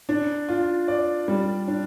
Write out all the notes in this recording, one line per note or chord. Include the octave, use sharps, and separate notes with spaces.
D4
F4
D5
G3
D4